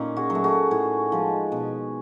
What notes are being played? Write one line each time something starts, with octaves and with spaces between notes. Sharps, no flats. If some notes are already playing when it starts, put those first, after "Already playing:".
Already playing: A#2 C#4 D#4
F#4 G#4
F#3
A3
F#4 G#4
A2 F#4 G#4
F3 G#3
B2